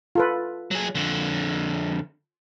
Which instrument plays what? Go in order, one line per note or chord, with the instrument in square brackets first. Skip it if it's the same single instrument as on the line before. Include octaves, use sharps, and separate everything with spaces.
[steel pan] F4 A4 B4
[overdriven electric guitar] F#3 G#4
F2 D3